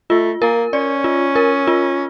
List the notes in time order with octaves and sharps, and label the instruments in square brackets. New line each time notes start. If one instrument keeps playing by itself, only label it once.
[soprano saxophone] A3 [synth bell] F4
[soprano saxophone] A#3 [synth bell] A#4
[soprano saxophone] C#4 [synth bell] D5
[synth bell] F4
A#4
F4